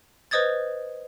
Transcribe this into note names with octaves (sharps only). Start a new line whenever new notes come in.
B4 C5 D#5 D#6 G#6 A6